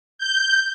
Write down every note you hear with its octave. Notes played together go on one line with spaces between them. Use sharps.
G6